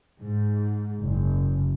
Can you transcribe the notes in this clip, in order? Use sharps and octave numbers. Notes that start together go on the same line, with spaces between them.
G#2
F#1